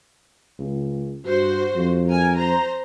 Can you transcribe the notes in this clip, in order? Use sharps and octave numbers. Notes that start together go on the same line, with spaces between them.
C#2
G2 F#4 C5
F2
A#4 G#5
C5 A#5